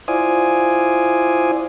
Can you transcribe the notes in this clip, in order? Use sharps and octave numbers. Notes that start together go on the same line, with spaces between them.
E4 F4 C5 D5 G#5 D#6